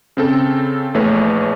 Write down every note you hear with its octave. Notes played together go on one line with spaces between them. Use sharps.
C#3 C4 A4
A#1 E2 A3 B4 C#5